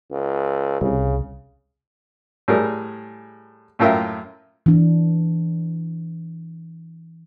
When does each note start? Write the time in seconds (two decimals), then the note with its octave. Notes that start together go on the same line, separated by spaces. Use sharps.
0.11 C#2
0.81 C2 C#3
2.48 A2 G3 G#4 A#4
3.79 F#2 A2 F4 A#4 E5 G5
4.66 E3 D4